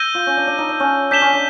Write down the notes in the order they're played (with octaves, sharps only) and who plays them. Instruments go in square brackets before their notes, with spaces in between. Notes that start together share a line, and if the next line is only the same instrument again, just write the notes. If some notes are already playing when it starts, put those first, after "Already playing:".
Already playing: [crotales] E6 G6 A#6 D#7 G7
[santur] F4
C#4
D4
D4
D#4
D4
C#4
[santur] D4 [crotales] G6 B6 E7 G7
[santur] C#4
D4